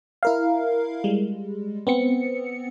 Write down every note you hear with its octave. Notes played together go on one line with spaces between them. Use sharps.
E4 A#4 F5
G3 G#3
B3 C4 C#7